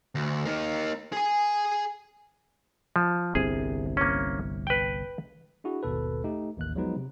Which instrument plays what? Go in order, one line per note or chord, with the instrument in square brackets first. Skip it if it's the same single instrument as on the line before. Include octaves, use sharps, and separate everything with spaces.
[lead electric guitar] D2
A#3 D#4
G#4 G#5
[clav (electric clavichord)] F3
[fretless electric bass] G1 C2 C3 [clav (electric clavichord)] G#4
[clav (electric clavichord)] A#3 C#4
B4 G5
[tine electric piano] D4 E4 F#4 G#4
G#1 D#2 B2 A4 B4
A3 D#4 G4
A1 D#2 F#6
F3 F#3 G#3 B3 D#4 B4
C3